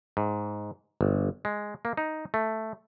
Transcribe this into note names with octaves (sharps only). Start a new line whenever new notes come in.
G#2
G1
G#3
A#3
D#4
A3